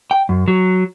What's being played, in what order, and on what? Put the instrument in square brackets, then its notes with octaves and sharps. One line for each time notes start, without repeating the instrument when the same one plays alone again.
[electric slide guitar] G5
F#2
F#3